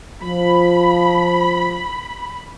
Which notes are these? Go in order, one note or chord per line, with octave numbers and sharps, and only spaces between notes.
F3 B5